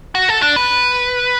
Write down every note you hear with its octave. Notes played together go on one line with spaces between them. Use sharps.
F#4
A4
D4
B4